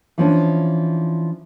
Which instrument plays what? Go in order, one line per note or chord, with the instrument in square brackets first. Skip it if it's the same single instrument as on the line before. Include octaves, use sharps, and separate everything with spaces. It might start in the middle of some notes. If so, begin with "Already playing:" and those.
[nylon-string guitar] E3 F3 C#4 D4